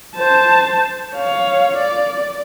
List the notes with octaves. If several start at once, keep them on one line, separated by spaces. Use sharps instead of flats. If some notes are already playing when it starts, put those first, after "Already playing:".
C5 A5
C#5 F5
D5